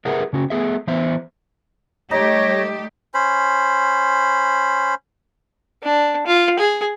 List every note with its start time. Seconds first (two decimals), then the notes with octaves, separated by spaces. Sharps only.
0.05 G4 G#4 A#4 B4 E5 F#5
0.33 C#3 C#4 F#4
0.50 A3 B3 G#4 E5
0.87 E3 B3 C5 E5
2.11 G3 A3 D#4 G4 C#5 A#6
3.14 C#4 C5 B5
5.83 D4
6.27 F4
6.59 G#4